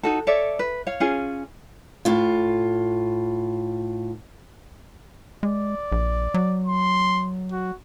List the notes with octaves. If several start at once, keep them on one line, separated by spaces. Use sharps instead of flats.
D#4 F#4 A4
A4 C#5 D5 E5
B4
C#5 F5
C#4 F4 G#4 F5
A2 F4
G#3 D5
A#1
F#3
C6
F#4